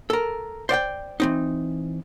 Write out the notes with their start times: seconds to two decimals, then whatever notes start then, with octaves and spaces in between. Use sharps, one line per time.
0.10 A4 A#4
0.69 C5 D5 F#5 G5
1.20 E3 C4 D#4